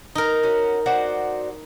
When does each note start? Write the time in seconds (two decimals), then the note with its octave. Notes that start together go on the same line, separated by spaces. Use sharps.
0.15 D#4 A#4
0.43 C#4 F#4
0.86 F#4 C5 D5